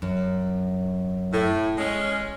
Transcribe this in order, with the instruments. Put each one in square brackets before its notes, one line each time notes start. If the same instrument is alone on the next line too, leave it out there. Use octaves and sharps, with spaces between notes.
[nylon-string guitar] F#2
[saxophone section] A2
G#3 C#4